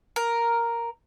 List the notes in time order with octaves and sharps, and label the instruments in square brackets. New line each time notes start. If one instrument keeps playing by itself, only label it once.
[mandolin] A#4